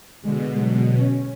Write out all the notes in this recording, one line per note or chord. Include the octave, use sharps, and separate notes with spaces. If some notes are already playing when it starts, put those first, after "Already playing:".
B2 D3 G#3
D3 F#3 G#3
C#4